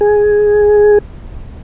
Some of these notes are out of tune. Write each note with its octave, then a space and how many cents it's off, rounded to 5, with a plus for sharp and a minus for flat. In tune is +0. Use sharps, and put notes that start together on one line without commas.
G#4 +5